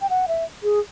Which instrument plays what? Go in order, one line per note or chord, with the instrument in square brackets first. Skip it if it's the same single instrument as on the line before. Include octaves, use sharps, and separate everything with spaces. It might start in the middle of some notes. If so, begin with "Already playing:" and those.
[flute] G5
F#5
E5
G#4